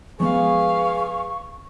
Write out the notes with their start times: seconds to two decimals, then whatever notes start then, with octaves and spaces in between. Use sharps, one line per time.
0.20 F3 G#3 B3 G#4 B4 F5 C#6